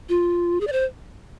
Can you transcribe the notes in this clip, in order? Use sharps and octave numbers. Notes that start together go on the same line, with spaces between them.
F4
G#4
D5
C5